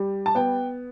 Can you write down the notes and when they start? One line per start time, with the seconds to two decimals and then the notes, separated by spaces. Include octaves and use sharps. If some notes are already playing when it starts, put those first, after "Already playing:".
Already playing: G3
0.26 A5
0.35 B3 G5